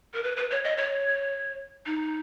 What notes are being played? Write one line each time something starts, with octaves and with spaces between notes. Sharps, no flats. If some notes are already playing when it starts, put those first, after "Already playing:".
A#4
B4
B4
C#5
D#5
C#5
D#4